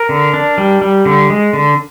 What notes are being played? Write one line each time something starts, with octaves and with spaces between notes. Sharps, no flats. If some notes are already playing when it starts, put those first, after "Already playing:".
Already playing: A#4
D3
D4
G3
G3
D3
G#3
D3